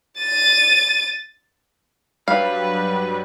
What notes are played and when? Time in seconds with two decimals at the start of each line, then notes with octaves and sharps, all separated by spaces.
0.18 A6 D#7
2.28 G2 F#3 G3 B4 F5